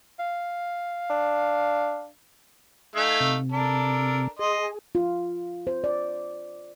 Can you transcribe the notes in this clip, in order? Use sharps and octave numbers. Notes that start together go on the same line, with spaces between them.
F5
D4
A3 D#4 F5 G#5 G#6
C3
D4 A4 A#4
G#4 D#5 C6
F4
C5
D5